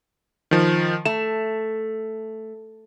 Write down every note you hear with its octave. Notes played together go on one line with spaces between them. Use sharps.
D#3 F3
A3 E7